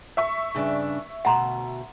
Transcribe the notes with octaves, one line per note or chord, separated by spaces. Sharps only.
E5 C#6
G2 C#3 D4
D2 B2 F#5 A#5 C6